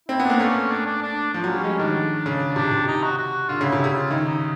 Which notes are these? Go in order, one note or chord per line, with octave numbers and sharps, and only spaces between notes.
C4 E4
B3
D4
A#3
A3 C#4
D4
D4
D4
F3 D4
F#3 C#4
G3
G#3 C#4
D#3 D4
C#3
C3 D4
C3
D#4
F#4
F#4
D3 F4
C#3 E4
C3
C#3 E4
F4
D#3 E4
D#4